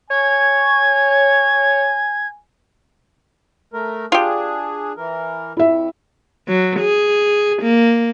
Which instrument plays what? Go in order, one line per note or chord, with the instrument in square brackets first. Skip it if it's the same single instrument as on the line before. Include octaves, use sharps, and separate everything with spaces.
[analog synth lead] C#5 [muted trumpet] G#5 [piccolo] G#6
[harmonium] A3 A#4
[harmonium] D4 G#4 [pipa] F4 G4
[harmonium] E3 A#4
[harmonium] F2 [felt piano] E4 E5
[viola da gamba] F#3
G#4
A#3